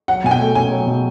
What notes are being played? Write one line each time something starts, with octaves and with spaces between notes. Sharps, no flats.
F#3 F#5
B2 G#5
G5
A3
C#4 G#5
F#3
B2